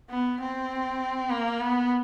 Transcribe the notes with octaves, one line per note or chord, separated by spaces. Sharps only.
B3
C4
A#3
B3